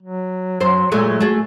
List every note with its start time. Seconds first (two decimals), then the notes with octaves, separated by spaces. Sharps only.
0.03 F#3
0.60 F#2 F#3 C5
0.92 A#2 F#3 G#3 A3
1.21 A3 F#4 G#4